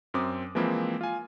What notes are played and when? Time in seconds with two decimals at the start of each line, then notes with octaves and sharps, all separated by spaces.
0.14 F#2 C4 D6 D#6
0.55 E3 F3 G#3 A#3 C4 E4
1.01 F4 G#5